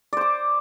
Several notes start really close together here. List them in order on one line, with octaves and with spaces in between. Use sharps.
D5 C5 D6